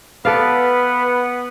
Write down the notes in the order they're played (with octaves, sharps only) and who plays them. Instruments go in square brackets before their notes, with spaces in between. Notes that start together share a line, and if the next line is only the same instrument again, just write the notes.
[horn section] B3 [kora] A4 D5 F5 [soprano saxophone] B4